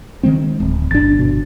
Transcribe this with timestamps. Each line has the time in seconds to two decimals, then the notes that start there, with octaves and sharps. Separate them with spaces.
0.23 D#3 G#3 C4
0.60 D1
0.91 G1 D4 A6
1.19 B2